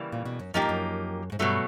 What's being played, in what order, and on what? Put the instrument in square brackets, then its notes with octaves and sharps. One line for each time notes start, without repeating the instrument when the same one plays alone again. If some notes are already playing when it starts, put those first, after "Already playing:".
Already playing: [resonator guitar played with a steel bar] C#3 E3 G3 A#3
[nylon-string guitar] A#2
B2
F#2
[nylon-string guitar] F#2 [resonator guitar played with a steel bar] F3 A#3 D#4 G4
[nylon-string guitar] G2
F#2
G#2
[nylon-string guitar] G2 [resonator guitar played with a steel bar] B2 F#3 A3